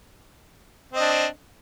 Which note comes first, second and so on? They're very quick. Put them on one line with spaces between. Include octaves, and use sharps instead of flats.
C4 D#5 D4